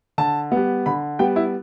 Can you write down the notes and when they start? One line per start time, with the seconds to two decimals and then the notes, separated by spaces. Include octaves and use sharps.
0.18 D3 A5
0.52 G3 B3
0.86 D3 B5
1.19 G3 B3 G5
1.36 E4